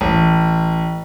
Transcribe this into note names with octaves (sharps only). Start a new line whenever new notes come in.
A1